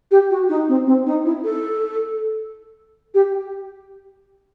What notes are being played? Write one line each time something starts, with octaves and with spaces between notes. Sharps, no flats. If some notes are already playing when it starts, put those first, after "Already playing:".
G4
F#4
D#4
C4
C4
D#4
E4
A4
G4